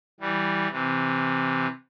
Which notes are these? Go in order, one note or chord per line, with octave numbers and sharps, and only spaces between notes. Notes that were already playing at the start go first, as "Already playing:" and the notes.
E3 G3
C3 E3